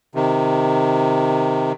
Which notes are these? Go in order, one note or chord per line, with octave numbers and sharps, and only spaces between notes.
C3 D#3